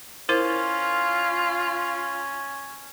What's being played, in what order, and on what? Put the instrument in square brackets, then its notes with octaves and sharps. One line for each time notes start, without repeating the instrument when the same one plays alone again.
[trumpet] C#4 [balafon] E4 A#4 C5 [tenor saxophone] F4